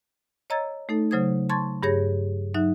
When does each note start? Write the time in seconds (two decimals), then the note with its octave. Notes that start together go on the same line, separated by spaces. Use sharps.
0.50 C#5 D#5 A#5 E6 G#6 A6
0.89 A3 D#4 A4
1.11 C#3 F#3 C5 D#6 G#6
1.49 A5 C6 C#6 G#6 A6
1.83 G2 G4 G#4 C#5 A#6
2.54 F#3 D#4 E5 F#6